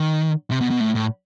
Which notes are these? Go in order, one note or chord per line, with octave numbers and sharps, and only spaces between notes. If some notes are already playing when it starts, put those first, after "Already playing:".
Already playing: D#3
C3
B2
B2
A2
A2